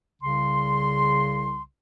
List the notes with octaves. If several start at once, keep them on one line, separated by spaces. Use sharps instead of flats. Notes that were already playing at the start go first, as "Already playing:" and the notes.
C2 C#3 C6